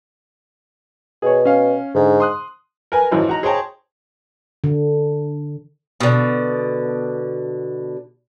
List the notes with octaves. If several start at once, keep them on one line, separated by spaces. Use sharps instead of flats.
B2 G#4 C#5
C#4 F5
G#2 D3
C6 D#6 F#6
A#4 B4 G#5
G#1 E3 F#3 C5
D#4 F#4 A#5
G#4 C5 C#5 G5 A5 A#5
D3
B2 D3